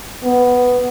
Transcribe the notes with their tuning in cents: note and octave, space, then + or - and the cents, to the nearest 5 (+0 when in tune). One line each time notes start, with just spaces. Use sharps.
B3 +0